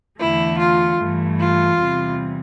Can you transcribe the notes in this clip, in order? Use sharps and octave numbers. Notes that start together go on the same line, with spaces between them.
E2 D3 A3 E4
F4
G2 E3 A3
F4
E2 C3 E3 G3